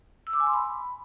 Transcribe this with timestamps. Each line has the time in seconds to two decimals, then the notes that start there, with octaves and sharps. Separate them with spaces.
0.27 E6
0.33 D6
0.40 G#5
0.47 C6
0.54 B5